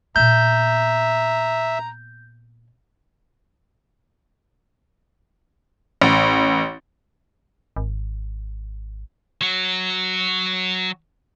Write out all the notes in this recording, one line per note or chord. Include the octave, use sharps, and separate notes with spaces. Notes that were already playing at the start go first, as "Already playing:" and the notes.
A#2 B3 E5 A#5 G6
A1
G#1
F#3 F#4